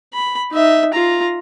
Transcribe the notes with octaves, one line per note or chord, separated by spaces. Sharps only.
B5
D#4 E5
F4 A#5